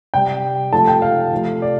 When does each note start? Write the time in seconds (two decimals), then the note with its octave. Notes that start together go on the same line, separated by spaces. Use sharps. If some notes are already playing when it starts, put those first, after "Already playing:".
0.14 C3 G3 G5
0.72 C3 F3 A3 A5
0.87 G5
1.02 F5
1.32 C3 F3 A3
1.62 D5